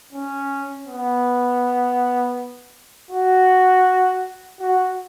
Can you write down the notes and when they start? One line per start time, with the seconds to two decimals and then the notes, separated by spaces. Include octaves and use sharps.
0.12 C#4
0.87 B3
3.11 F#4
4.60 F#4